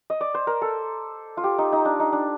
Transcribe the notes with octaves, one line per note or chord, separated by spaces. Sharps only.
D#5
D5
C5
A#4
A4
F4
G4
D#4
D#4
D4
D#4
D4